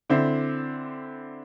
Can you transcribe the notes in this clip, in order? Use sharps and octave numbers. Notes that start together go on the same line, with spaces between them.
D3 C4 E4